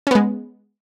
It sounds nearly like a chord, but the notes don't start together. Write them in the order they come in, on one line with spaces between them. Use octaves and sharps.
C#4 B3 G#3